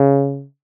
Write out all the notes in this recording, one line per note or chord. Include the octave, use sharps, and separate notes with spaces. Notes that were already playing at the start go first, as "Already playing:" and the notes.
Already playing: C#3